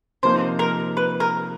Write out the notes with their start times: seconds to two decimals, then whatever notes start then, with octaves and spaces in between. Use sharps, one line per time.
0.23 C3 F3 A#3 D#4 C5
0.59 A#4
0.97 B4
1.20 A#4